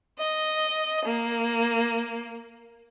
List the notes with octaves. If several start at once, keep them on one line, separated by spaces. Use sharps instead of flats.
D#5
A#3